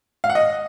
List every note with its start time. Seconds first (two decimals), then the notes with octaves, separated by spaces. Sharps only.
0.24 F5
0.30 F#5
0.35 D#5